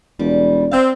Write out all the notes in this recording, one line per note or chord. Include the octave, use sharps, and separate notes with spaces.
E1 G3
C4 F5